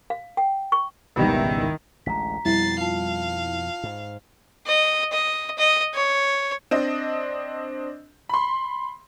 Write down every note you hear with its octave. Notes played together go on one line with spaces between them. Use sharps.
F5
G5
C#6
G#1 C#2 B2 D#3 G3 E4
A1 D2 G#3 A#5 B6
F2 B2 G3 E4 A6 C7
F4 F5 A5
G#2
D#5
D#5
D#5
C#5
C4 D4 D#5
B5 C6